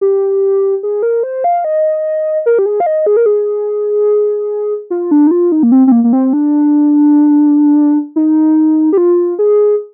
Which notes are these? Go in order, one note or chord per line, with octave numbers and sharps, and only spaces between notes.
G4
G#4
A#4
C5
F5
D#5
A#4
G4
G#4
F5
D#5
G#4
A#4
G#4
F4
D4
D#4
F4
D#4
A#3
C4
C4
A#3
A#3
C4
D4
D#4
G4
F4
G#4